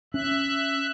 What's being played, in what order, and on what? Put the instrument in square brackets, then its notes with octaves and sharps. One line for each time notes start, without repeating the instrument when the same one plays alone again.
[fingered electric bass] C#4 [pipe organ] E5 F#6